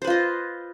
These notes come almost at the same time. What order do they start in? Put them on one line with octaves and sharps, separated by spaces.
C5 B4 F4 D#5